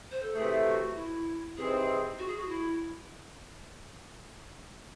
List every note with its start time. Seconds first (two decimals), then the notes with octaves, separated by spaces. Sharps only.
0.11 C5
0.23 A4
0.34 C3 E3 A3 G#4
0.66 F#4
0.95 E4
1.57 C3 E3 C4 D#4 G#4
2.18 F#4
2.28 G#4
2.37 F#4
2.49 E4